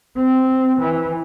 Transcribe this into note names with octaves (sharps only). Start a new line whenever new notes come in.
C4
E3